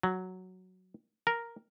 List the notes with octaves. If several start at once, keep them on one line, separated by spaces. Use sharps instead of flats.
F#3
A#4